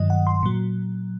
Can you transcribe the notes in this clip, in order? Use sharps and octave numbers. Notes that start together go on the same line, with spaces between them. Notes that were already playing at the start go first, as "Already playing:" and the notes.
Already playing: G2 D#3 F#3 D#5
F#5
C6
A#2 F#3